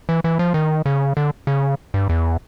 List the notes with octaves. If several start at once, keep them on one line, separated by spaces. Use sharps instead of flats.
E3
E3
F3
D#3
C#3
D3
C#3
G2
E2